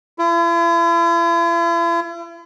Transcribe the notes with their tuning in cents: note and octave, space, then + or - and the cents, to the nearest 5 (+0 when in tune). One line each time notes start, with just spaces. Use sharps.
E4 +45